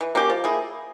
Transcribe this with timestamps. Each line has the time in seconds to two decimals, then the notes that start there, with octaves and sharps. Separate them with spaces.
0.01 E3
0.15 A#3 C#4 G4
0.30 F3
0.44 A#3 E4 G#4